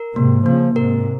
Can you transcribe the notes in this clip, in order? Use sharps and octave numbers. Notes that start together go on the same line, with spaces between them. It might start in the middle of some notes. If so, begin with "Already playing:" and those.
Already playing: A#4
G#2 C3 A#3
C#3 F3 A#3
G#2 C3 A#4